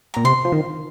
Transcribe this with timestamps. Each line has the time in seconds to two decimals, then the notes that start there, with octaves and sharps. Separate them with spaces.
0.14 A#2 A#5
0.25 C3 C6
0.45 F3
0.52 D#3